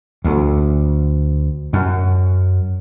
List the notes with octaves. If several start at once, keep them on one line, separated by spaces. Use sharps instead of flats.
D2
F#2